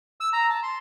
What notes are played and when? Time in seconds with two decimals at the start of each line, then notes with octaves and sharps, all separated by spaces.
0.21 E6
0.33 A#5
0.50 A5
0.63 C6